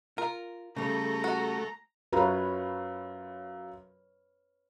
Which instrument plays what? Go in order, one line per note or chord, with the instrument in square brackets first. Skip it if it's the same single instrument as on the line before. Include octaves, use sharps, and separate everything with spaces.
[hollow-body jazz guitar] F4 [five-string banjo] A#4
[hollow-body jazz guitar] C#3 G3 [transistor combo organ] A3 [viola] A#5
[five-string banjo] F#4
[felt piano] F#2 F4 A#5 [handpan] B4 C#5